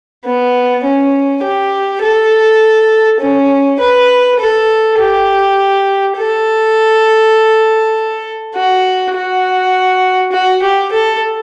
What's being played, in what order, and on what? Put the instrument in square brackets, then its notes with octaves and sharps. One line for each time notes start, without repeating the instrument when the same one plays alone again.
[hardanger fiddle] B3
C#4
G4
A4
C#4
B4
A4
G4
A4
F#4
F#4
F#4
G4
A4